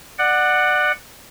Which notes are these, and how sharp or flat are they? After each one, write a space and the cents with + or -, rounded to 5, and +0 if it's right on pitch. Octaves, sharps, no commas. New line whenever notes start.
D5 +25 F#5 +0